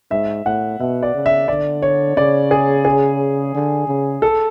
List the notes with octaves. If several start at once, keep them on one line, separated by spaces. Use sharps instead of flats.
G#2 E5
A2 F#5
B2 E5
D5
C#3
E5
D3 D5
C#5
C#3 D5
G#4
G#4
D3
C#3
A4